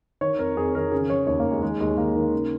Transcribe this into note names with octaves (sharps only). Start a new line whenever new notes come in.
D#3 C#5
F2 A#4
F2 G#4
D#3 A#4
C#3 G#4
F3 C#5
D#2 C#5
D#2 A#3
G#3
D#3 G#3
D#2 G#3
D#2 A#3
D#3
C#3